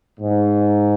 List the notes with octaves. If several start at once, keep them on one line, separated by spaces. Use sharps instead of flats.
G#2